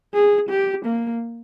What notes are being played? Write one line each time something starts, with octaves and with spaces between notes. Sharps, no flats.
G#4
G4
A#3